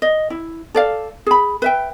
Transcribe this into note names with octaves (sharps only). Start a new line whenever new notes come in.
D#5
E4
A4 D5 F5
G#4 B5
B4 E5 G5